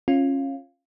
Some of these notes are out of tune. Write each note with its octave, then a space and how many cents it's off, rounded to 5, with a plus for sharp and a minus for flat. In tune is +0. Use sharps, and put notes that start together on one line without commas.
C#4 -25 F4 +0